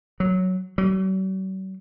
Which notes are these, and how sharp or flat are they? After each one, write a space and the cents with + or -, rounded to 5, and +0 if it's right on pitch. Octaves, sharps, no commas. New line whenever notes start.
F#3 +0
F#3 +45